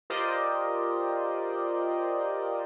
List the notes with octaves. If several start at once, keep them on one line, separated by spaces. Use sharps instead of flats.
F4 G4 A#4 C5 D5 D#5